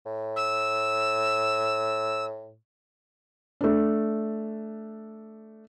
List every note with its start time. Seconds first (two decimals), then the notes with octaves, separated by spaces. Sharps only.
0.05 A2
0.36 E6
3.61 A3 D4